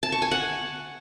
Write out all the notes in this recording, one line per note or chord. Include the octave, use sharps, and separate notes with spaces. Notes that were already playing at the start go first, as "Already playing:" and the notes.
A5
C#6
G#5
F#5